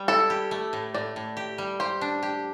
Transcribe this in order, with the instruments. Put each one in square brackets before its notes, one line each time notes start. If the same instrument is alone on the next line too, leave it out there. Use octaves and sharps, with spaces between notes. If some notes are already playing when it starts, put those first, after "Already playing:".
Already playing: [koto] G3
[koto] E4 [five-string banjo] A4
[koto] G4
A3
A2
[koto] A2 [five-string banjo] D5
[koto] A2
G4
G3
[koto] G4 [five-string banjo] C5
[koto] D4
G4